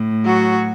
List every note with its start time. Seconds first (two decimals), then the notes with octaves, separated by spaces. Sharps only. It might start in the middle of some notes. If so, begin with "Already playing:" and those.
Already playing: A2
0.26 F#3 F#4